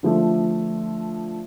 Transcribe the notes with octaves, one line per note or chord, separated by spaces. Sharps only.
D3 F3 A3